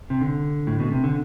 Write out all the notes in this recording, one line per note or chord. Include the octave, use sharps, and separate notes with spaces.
C3
D3
A2
B2
C3
D3